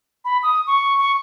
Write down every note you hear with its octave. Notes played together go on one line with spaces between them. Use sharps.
B5
D#6
C#6
C#6